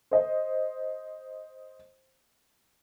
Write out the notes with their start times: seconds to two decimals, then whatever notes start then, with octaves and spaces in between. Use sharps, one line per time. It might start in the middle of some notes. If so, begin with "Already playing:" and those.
0.11 C5 D#5